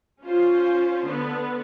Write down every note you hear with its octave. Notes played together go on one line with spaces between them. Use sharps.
C#4 F4 C5
D3 B3